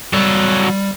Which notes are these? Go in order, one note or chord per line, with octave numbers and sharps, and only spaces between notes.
F#3 G3 A4